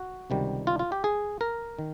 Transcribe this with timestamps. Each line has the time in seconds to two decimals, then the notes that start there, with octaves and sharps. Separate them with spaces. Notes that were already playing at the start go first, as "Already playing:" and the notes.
Already playing: F#4
0.30 C#2 C3 D#3 G3
0.67 F4
0.79 F4
0.92 G4
1.04 G#4
1.41 A#4
1.79 D#3